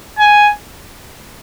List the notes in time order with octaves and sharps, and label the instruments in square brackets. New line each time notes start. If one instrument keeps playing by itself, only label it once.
[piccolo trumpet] G#5